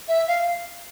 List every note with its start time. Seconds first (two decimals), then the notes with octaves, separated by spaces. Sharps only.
0.09 E5
0.28 F5